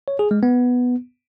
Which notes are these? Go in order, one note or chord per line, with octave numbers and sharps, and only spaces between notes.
C#5
G#4
G#3
B3